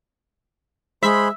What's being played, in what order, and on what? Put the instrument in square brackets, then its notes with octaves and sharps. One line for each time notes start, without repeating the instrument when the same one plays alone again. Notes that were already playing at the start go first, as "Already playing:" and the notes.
[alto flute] G#3 [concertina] C5 B5 [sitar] E5